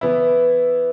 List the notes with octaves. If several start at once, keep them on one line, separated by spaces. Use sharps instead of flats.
E3 B3 E4